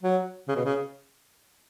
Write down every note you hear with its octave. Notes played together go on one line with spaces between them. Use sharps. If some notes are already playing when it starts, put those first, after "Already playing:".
F#3
C#3
B2
C#3